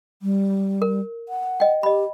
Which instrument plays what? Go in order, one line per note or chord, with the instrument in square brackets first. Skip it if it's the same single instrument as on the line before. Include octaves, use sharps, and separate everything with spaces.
[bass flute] G3
[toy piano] A#4
[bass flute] F#5
[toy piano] D#5 G5
[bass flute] G4 [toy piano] D#5 B5